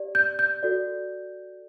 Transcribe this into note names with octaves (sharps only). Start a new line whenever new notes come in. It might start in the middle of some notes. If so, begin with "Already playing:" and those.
Already playing: G4 D5
G6
G6
F#4 A4 D5